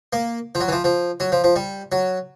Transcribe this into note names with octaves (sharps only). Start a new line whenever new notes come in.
A#3
F3
F#3
E3
F3
F3
F#3
F3
F3
G3
F#3